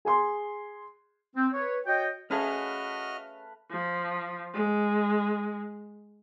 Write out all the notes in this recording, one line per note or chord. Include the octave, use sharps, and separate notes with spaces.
G#4 G#5 C6
C4
B4 C#5
F#4 C#5 D#5 G5
A3 C#4 F#4 G#4 B4 D#5 F5 F6
F3
G#3